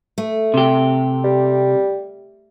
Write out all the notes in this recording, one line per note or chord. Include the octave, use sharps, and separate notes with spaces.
A3
C3 G4
G3